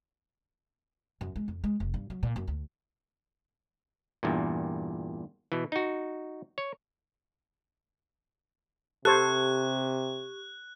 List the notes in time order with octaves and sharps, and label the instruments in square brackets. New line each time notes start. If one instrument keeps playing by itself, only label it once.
[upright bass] F#2
G#3
F2
G#3
F1
G2
F#3
A#2
F#2
D2
[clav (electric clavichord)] E2 G2 A#2
B2 E3
D#4 F#4
C#5
[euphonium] C3 [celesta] G4 C#6 G#6 [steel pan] A4 C5 [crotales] F#6